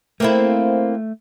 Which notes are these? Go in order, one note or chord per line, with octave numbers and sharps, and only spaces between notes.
A3 A#3 C4 E4